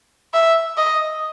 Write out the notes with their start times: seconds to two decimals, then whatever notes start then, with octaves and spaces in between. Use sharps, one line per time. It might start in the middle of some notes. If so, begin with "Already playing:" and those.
0.33 E5
0.77 D#5